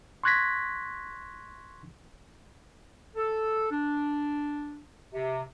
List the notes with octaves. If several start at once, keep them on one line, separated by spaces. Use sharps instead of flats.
C6 C#6 F#6 G#6 A#6 B6
A4
D4
C3